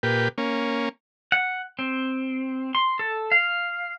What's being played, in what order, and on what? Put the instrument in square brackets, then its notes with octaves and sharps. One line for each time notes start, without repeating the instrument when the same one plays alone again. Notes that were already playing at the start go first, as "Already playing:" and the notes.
[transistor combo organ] A#2 G4 B4
A#3 C#4
[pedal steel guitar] F#5
C4
C6
A4
F5